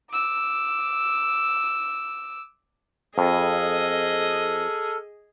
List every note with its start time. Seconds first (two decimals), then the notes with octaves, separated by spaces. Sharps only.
0.11 D6 E6
3.18 F2 G#4 A4 D#5 F6